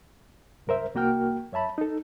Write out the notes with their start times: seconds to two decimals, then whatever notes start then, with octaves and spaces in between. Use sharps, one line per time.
0.67 C2 F#2 A#4 C5 E5
0.95 C2 A#3 F#4 A#4 G5 F6
1.52 F#2 C#5 E5 A5 B5
1.78 D#4 A4